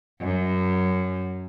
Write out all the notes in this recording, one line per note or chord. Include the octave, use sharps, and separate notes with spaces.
F#2